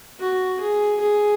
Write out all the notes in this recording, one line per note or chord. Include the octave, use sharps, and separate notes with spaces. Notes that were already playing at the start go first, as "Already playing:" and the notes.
F#4
G#4
G#4